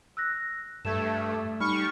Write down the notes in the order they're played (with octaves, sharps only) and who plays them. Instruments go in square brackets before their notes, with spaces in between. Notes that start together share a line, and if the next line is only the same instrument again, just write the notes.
[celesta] E6 F#6 A#6
[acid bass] G2 [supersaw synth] A3 [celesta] E6 G#6 E7
[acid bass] G3 [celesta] D#4 B5 F6 [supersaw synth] C#6